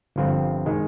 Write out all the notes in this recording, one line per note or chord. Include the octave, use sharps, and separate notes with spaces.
G1 G2 F3 C4
D#3 G#3